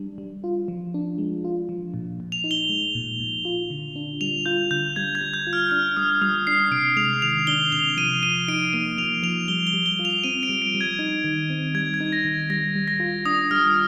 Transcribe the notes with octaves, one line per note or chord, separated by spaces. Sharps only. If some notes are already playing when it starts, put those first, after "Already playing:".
Already playing: G3 D4
G3
F4
F3
D4
G#3
F4
F3
A#2
A#2
F7
D#4
G7
G#3
A#2
A#2
F4
D3
D4
G3 F7
F4 G6
D3 G6
G3 G#6
G#6
G3
G6
F4
F6
D4 F6
G3 D#6
G3 D#6
D4 C7
C3 D7
G#3 F7
D#3 F7
D4 G7
C3 F7
F3 D#7
F3 D#7
D#4 D7
A#3 D#7
F3 F7
F3 F7
G3 G7
G7
G3
G7
F4
F7
C4 D#7
D7
G3
D7
G3
G#6
D#4
D#3
C4
G3 G#6
G#6
D#4
A#6
D#3
G3 A#6
G3
A#6
F4
D4 D#6
G3 F6